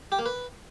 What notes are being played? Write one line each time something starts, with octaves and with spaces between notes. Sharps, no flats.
G4
A#3
B4